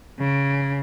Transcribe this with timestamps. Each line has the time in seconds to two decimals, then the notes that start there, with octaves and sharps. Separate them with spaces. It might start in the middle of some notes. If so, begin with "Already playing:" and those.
0.19 C#3